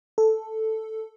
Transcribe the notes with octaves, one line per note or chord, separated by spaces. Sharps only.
A4